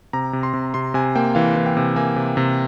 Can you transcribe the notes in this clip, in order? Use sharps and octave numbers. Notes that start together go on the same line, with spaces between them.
C3 A#5
C3
C6
C3
C3 C6
C3 G#5
A#3 G5
E3 F5
E3
G5
C3
A#3 G#5
C3
C3